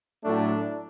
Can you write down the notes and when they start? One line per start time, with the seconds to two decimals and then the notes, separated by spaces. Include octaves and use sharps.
0.24 A2 F#3 A3 D4